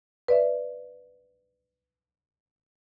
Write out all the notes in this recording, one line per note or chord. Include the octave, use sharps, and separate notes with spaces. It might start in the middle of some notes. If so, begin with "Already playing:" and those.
B4 D5 E5